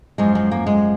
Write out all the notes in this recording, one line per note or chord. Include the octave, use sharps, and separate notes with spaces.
F#2 F3 G#3
G#3
A#3
G#3